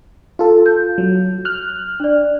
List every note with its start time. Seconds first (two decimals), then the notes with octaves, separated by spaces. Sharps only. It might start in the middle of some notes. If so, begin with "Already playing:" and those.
0.39 F4 A4
0.66 G6
0.98 F#3
1.45 F6 F#6
2.00 D4 D5